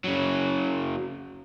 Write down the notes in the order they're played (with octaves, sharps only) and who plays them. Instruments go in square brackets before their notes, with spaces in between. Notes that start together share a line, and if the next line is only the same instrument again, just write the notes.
[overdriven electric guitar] C#3 F#3